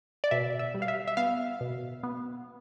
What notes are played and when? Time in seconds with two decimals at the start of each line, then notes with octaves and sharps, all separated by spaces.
0.24 D5
0.31 B2 E5
0.59 E5
0.74 G3
0.82 F5
0.88 E5
1.08 E5
1.17 B3 F5
1.61 B2
2.03 B3